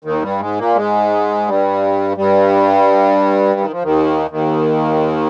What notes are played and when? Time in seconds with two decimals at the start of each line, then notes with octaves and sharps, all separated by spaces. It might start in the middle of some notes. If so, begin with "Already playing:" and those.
0.04 D#2 D#3
0.22 G2 G3
0.40 G#2 G#3
0.58 A#2 A#3
0.75 G#2 G#3
1.47 G2 G3
2.17 G2 G3
3.60 D#3
3.71 F3
3.83 D#2 D#3
4.30 D#2 D#3